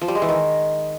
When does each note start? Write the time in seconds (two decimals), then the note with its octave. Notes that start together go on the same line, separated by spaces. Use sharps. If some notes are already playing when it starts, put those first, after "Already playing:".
0.02 F3
0.08 G3
0.15 G#3
0.22 E3
0.29 D#3